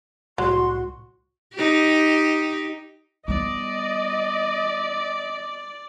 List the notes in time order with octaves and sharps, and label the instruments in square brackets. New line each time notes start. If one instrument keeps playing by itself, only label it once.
[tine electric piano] C2 A2 [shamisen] F#3 [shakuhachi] F#4 [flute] C6
[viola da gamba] D#4 G4
[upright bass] G3 B3 [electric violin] D5 [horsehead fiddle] D#5